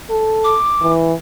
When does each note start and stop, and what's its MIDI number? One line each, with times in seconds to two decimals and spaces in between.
0.10 0.56 69
0.44 0.92 86
0.81 1.13 52